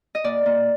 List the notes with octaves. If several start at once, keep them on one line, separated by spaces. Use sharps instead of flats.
D#5
A#2 D5
A#2